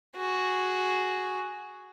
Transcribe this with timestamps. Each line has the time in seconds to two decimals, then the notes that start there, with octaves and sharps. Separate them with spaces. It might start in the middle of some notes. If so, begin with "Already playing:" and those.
0.17 F#4 G#4